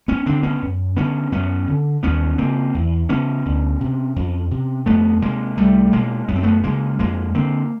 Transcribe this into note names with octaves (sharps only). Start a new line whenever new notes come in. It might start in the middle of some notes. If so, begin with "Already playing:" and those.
B3 C#4
D3 C4 D4
B3 C#4
F#2
D3 B3 C#4
F#2 B3 C#4
D3
D#2 B3 C#4
C#3 A#3 C4
E2
C#3 B3 C#4
D2
C3
F2
C3
F2 A3 B3
C3 G#3 A#3
C2 G3 A3
B2 G#3 A#3
F#2 B3
C4
A3 B3
C#3 G#3 A#3
F2 G#3 A#3
D3 A#3 C4